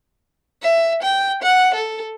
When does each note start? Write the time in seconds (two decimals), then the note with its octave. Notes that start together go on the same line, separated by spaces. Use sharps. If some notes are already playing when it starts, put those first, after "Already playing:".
0.63 E5
1.02 G5
1.42 F#5
1.74 A4